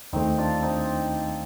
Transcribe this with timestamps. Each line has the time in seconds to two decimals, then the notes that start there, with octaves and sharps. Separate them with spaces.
0.13 D#2 D#3 A3 C4 D#4
0.38 D4 F4
0.62 C4 D#4